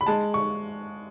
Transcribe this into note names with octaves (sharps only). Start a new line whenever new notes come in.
B5
G#3 A5
C#6